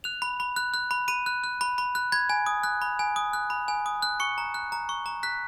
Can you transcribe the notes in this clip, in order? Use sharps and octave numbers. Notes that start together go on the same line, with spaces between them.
F#6 F7
B5
B5
F#6
F#6
B5
B5 D#7
F#6
F#6
B5
B5
F#6
B5 G#6
G#5
D#6
F#6
B5
G#5
D#6
F#6
B5
G#5
D#6
F#6
C#6 C#7
A#5
F#6
A#5
C#6
A#5
F#6 B6